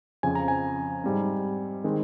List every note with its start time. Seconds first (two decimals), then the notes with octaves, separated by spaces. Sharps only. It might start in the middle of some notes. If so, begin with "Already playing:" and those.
0.23 F2 C#3 F3 G#5
0.35 A#5
0.48 G#5
1.04 G#2 G3 C4
1.84 D#3 G#3 C4